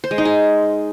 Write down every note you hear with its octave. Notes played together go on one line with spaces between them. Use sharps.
C5
G#3
D#4
G#4